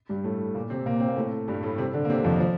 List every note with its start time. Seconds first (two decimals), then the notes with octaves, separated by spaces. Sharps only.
0.09 G2 G3
0.24 A2 A3
0.55 A#2 A#3
0.70 C3 C4
0.86 A#2 A#3
1.00 C4
1.09 A#3
1.16 A2 A3
1.48 G2 G3
1.63 A2 A3
1.78 C3 C4
1.93 D3 D4
2.05 A#3
2.10 C3 C4
2.24 F2 F3
2.40 F3